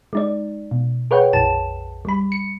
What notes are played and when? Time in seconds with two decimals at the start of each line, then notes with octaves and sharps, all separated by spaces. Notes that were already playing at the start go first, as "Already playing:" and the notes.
0.13 G#3 D#4 D5
0.71 B2
1.11 G#4 B4 C#5 F#5 G5
1.33 A#1 F2 A5 E7
2.05 G3 B5
2.32 C#7